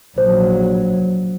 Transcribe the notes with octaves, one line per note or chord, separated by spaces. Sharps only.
A#1 F#3 C5